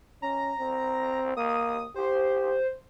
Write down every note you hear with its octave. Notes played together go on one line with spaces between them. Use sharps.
C#4 A#5
C4
A#3 D#6
G4 C5